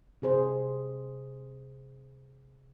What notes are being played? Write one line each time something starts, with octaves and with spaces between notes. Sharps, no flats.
C3 G#4 C5